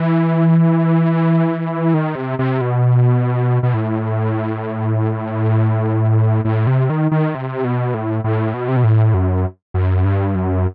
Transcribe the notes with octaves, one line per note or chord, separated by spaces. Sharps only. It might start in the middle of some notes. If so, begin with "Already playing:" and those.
Already playing: E3
D#3
C3
C3
B2
B2
A2
A2
C3
D#3
D#3
C3
B2
A2
A2
B2
C3
B2
A2
F#2
F#2
G2
F#2